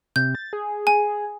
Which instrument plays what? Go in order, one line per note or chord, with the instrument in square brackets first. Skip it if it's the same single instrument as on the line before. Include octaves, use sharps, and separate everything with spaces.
[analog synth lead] C3 [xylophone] G6
[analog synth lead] A6
G#4
[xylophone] G#5